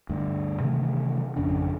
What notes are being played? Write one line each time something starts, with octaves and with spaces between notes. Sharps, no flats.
D2 G2
C3 D#3 E3 A3
G#1 F2 C#3 D4